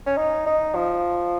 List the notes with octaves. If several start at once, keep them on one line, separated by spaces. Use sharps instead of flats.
C#4
D#4
D#4
F3